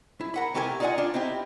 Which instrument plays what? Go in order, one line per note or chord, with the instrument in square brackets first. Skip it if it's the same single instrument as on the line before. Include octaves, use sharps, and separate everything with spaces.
[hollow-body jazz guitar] E4
A#4 F#5 B5
C3 A3 G4 A#4 D#5 G#5
D#4 F4 D5 D#5 F#5 G#5
D4 F4
C4 D#4 E4 G4